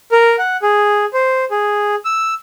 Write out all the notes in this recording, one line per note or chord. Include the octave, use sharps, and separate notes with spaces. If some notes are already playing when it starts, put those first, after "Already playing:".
A#4
F#5
G#4
C5
G#4
E6